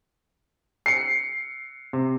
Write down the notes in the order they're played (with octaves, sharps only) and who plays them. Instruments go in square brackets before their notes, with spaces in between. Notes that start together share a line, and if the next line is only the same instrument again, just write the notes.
[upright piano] C7 C#7
[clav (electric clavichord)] C3